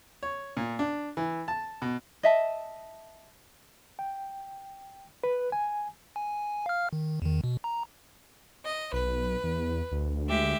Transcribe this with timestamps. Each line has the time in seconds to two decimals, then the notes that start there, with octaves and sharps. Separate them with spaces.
0.23 C#5
0.57 A#2
0.79 D4
1.17 E3
1.48 A5
1.82 B2
2.23 D#5 E5 A5
3.99 G5
5.24 B4
5.52 G#5
6.16 G#5
6.66 F5 F6
6.93 D#3
7.22 E2 D#3
7.44 B2
7.64 A#5
8.63 D#5
8.93 B1 B4
9.43 E2
9.91 D2
10.27 G#3 G4 E5